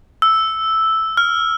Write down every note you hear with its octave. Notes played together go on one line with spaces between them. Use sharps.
E6
F6